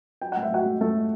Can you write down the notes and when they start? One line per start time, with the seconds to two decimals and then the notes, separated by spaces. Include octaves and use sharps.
0.22 F#3 G5
0.32 A2 F#5
0.43 E5
0.50 A2 F#4 F#5
0.66 A3
0.81 F#3 A3 A4
0.95 A2